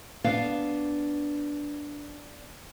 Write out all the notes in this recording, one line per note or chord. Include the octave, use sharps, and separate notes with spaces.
B3 D4 F5